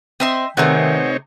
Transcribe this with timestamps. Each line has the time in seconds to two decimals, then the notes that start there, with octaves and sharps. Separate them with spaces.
0.20 C4 D#5 E5 C6
0.57 C3 D#3 A3 B3 C4 D#4 G#4 C#5